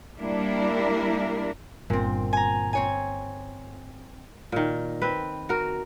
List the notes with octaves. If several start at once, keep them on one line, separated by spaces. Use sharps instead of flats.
G3 A#3 D4 E4 A#4
G1 A#2 C4
G#5 A#5
C4 C#5 G#5
A#2 D#3
C4 B4
F#4 A#4